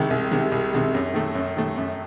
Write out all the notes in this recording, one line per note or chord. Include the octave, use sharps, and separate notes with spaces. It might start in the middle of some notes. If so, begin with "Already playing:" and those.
Already playing: C2 C3 D#3 G#3
C2
C3 D#3 G#3
C2
C3 D#3 G#3
F#2
D#3 A3
F#2
D#3 A3
F#2